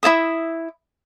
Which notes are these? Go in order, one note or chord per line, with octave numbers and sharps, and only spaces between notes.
E4 D5 E5 D#6